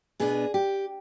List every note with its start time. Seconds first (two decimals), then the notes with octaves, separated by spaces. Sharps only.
0.20 B2 B3 D4 G#4
0.54 G4